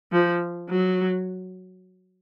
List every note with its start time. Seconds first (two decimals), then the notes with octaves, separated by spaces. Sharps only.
0.12 F3
0.70 F#3